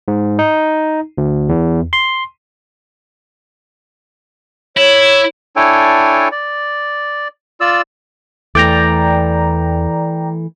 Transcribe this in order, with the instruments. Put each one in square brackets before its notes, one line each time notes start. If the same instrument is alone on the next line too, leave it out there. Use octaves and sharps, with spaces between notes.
[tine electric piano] G#2
D#4
D2
E2
C6
[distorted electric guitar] E4 [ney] C#5
[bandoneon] D4 E4 A4 C#5 G5 G#5
D5
F4 D5 E6
[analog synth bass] E2 [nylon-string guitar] E3 A3 [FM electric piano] D5 G5 A#5